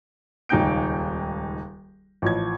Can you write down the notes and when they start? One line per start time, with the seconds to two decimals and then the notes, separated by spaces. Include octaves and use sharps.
0.49 D#1 C#2 D#4 G5 G6 D7
2.22 A1 F3 G#6